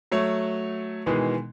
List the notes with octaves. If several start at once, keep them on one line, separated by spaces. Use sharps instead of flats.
F#3 A3 C#5
B2 D#3 E3 G#3